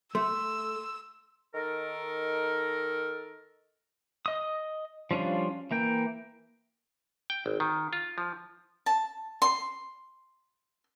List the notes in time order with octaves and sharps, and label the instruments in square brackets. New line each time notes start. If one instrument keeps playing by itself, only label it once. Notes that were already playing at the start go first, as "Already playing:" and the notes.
[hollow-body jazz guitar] A3 [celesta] C6 [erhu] E6
[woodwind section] D#3 D#4 A4 A#4
[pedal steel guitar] D#5 D#6
F3 G3 C#4 D4 F4
E3 A#3 G5
[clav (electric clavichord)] G5
G#1
D#3
F4
F3
[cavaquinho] A5
C6